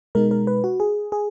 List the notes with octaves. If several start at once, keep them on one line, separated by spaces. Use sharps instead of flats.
B2 G#3 D#4 A#4
A#4
B4
F#4
G#4
G#4